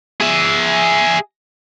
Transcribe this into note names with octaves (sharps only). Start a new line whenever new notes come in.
G#4 E5